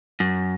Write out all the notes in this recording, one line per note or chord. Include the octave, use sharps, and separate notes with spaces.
F#2